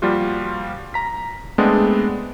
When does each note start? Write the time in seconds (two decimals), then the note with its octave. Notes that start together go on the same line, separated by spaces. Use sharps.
0.02 F3 G3 A#3 F4 F#4
0.94 A#5 B6
1.58 G#3 A3 B3 C4 D4